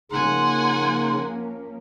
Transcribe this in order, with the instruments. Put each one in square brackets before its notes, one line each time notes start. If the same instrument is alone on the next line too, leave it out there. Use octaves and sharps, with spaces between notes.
[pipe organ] C#3 D#4 [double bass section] F3 A#3 C#4 [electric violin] F#5 G#5 [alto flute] C6